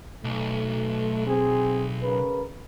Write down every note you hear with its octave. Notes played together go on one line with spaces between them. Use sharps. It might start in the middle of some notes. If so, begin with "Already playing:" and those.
B1 A3
C4 G#4
C#3 A#4 B4